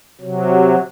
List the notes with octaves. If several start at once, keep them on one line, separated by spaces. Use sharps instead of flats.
C3 F#3